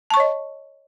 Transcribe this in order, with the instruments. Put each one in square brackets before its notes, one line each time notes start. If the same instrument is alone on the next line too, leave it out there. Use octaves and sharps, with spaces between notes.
[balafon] A5
C#6
C#5
D#5